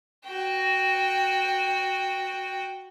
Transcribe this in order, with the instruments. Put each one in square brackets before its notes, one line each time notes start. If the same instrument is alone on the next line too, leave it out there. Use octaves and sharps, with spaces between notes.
[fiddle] F#4 G5